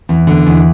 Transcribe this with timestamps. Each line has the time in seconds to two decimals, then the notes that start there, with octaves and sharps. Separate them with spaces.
0.09 E2
0.27 D3
0.46 E2